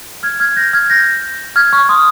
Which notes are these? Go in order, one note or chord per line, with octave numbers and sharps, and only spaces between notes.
F6 G#6
F6 G#6
G6 A#6
F6 G#6
G6 A#6
F6 G#6
C#6 F6
C6 D#6